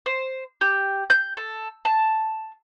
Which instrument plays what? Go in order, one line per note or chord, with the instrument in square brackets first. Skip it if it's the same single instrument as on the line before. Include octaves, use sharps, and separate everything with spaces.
[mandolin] C5
G4
G6
A4
A5